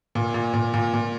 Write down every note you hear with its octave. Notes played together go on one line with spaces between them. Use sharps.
A#2
A#2
A#2
A#2
A#2